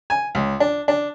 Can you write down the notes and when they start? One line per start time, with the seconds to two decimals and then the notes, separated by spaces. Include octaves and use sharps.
0.10 G#5
0.35 C#2
0.60 D4
0.88 D4